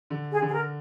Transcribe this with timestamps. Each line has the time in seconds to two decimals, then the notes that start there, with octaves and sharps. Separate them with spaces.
0.10 D3
0.32 G#4
0.42 D3
0.47 G#4
0.52 A#4